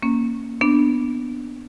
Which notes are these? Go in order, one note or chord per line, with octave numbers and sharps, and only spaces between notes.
A#3 C#4
B3 D4